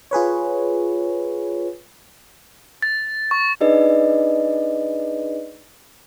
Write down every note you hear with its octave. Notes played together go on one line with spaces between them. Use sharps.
F4 G#4 B4 C#5
A6
C#6
D4 D#4 G#4 B4 D5 D#5